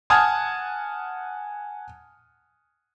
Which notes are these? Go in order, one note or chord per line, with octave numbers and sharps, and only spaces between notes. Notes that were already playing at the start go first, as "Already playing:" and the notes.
F#5 G#5 A5 D#6 F6 G#6